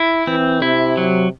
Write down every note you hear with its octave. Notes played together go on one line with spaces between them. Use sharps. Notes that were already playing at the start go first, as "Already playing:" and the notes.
Already playing: E4
E3 C4
C3 E4
F#3